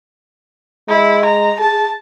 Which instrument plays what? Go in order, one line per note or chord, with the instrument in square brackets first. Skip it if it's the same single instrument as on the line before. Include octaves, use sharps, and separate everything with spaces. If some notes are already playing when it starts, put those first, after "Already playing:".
[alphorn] G#3 [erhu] E4
[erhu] A#5
[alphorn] G#4 [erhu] A5